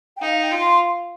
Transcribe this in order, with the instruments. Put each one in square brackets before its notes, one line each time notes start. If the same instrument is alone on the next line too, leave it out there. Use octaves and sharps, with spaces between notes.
[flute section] G5
[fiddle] D#4 [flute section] F5
[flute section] G5
[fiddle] F4
[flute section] C6